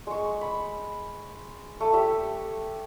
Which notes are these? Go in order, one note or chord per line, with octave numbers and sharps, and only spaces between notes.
G#3 C#6
B5
A3
G4 E5 G5